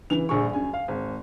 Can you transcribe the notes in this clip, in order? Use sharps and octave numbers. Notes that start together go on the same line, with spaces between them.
C#3 E3 F7
D#1 A#1 G#4 C#6
F#2 G#5
F5
G#1